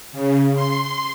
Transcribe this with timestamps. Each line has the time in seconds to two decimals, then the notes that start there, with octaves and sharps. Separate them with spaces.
0.12 C#3
0.55 C6